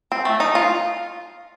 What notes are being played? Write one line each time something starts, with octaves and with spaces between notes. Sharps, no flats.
C4
A3
D#4
F4